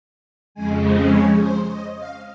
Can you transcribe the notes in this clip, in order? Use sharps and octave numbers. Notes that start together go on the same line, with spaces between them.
F2 C#3 G#3 G#5
C5
C#5
C5
D#5
F5